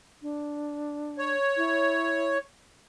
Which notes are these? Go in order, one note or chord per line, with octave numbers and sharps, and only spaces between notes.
D4
C#5
E4